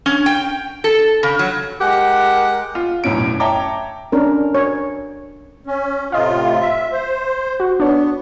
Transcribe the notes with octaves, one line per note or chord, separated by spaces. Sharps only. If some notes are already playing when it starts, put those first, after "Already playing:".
C#4
G5
A4
C#3
F#3
G#3 G4 A#4 F#5
F4
E1 F#2 A2 C#4 D7
C#5 E5 G5 A5 A#5 D6
C#4 D4 A#4
C#5
C#4
A2 C3 F4 D#5 F5
E5
C5
F#4
B3 D4 C#5